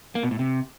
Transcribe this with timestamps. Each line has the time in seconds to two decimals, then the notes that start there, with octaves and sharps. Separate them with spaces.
0.15 A#3
0.23 B2
0.31 A2
0.39 C3